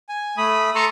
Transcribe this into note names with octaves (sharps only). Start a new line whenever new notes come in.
G#5
A3 B5 D#6
A4 A5 A#5 C6 C#6